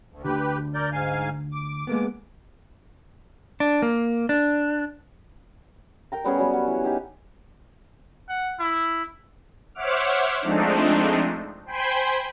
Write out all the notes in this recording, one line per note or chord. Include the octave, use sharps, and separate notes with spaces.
D2
D2 D3 G4 B4
A#4 D5 G6
G#2 F5 G#5
D6
G#3 A#3 B3
D4
A#3
D4
A#4 G5 A#5
G3 B3 C#4 G#4
F#3 G3 B3
F#5
E3
D#4 G4 G#4
F#5
E4
C5 C#5 E5 F#5 D6 F6
F3 G#3 A3 C4 D4 D#4
C5 G5 G#5 B5 C6